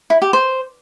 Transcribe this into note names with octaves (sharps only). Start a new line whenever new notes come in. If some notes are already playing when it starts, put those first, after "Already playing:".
E4
G4
C5